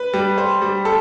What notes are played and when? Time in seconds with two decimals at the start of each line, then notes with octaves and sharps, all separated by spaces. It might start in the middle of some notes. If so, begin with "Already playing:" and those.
Already playing: B4
0.13 G3
0.38 C5
0.62 G3
0.85 A4